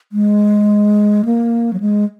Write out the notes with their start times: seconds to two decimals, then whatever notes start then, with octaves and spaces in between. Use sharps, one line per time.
0.12 G#3
1.25 A#3
1.73 F#3
1.80 G#3